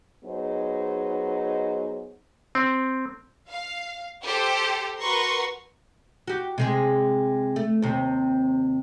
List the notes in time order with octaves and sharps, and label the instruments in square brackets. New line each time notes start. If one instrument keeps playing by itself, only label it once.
[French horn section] F#3 B3 D#4 G#4 C5 D#5
[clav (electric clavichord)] C4
[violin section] F5
G4 A4 C5
F#4 A#4 B4 A#5 C6 C#6
[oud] F#4 G4
C3 G#3 G#4
A3
D#2 C3